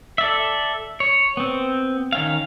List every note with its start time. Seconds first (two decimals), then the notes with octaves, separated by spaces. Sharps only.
0.18 A4 D5 E5
1.00 C#5
1.37 B3 C4
2.13 D#3 C#4 F5